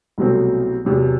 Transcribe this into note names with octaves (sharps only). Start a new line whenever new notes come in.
C2 B2 F#3 A3 C4
E2 C3 F#3